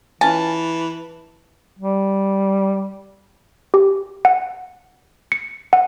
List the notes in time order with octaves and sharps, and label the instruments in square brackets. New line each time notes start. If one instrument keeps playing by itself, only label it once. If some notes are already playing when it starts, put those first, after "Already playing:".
[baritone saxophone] E3 [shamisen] C#4 F4 G#5 [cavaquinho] A5
[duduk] G3
[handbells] G4
F#5
C#7
F#5